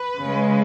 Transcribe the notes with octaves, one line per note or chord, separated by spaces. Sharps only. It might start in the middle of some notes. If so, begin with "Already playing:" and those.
Already playing: B4
C#3
G#3